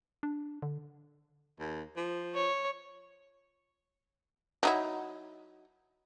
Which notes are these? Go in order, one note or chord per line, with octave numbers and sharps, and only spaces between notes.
D4
D3
D#2
F3
C#5
F#3 D#4 E4